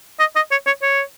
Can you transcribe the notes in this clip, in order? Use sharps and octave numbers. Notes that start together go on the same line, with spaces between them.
D#5
D#5
C#5
C#5
C#5